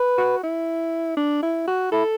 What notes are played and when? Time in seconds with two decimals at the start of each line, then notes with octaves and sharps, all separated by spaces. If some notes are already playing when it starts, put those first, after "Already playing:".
Already playing: B4
0.18 F#4
0.43 E4
1.17 D4
1.43 E4
1.67 F#4
1.92 E4 A4